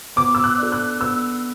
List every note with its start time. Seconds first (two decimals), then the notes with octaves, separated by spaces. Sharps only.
0.16 B3 D6
0.35 E6
0.44 F#6
0.58 D4 A4
0.72 F#6
1.00 B3 E6